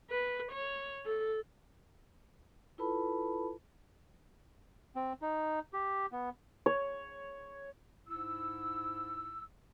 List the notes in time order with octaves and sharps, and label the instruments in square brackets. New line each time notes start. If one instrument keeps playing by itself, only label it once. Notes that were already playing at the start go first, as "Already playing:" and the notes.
[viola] B4
C#5
A4
[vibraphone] E4 F4 A4 B4 A5 B5
[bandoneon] C4
D#4
G4
B3
[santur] C#5
[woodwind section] G#2 E4 E6